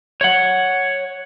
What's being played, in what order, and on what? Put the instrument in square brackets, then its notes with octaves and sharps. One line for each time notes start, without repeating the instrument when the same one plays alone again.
[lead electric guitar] C#5 F#5